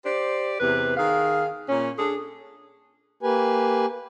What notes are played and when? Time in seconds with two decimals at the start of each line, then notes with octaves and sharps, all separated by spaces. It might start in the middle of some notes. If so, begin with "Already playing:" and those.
0.06 G4 C5 D5
0.60 E2 C3 B4
0.97 D#3 G#4 F5
1.69 A#2 C#4
1.98 D4 G#4 A4
3.23 A#3 G4 B4 G#5